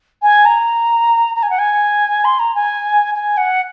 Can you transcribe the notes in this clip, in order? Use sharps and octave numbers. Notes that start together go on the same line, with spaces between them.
G#5
A#5
A#5
G#5
F#5
G#5
C6
A#5
G#5
G#5
F#5